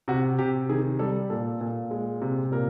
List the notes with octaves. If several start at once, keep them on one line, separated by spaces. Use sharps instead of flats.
C3 F#4
C3 G4
D#3 G#4
G3 A4
A#2 A4
A#2
G#3
C3
A#2 A#4